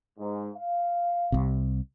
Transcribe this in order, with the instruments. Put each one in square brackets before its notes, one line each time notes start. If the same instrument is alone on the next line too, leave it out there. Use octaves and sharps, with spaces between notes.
[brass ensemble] G#2
F5
[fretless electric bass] C2 C3